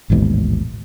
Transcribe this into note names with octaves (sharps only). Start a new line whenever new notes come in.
A1 D#2 G#2 B2